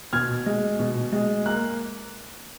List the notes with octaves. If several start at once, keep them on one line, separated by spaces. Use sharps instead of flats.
B2 F6 G#6
G#3
B2
G#3
A#3 F#6